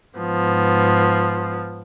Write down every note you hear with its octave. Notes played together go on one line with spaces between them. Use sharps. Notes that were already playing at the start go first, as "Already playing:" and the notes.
G#2 F3 B3